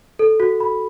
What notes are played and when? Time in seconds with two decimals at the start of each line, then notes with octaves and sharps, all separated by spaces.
0.19 A4
0.40 F#4
0.60 B5